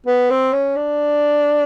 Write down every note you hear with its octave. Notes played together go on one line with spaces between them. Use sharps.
B3
C4
C#4
D4